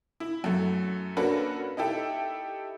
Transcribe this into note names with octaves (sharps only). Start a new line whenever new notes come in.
E4
F#2 A3
A#3 C#4 D4 F#4 A4 B4
D#4 E4 G4 A4 E5